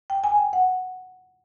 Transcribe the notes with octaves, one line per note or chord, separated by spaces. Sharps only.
G5
G#5
G5
F#5